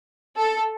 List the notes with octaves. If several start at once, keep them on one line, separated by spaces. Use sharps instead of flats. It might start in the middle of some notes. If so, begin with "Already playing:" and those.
A4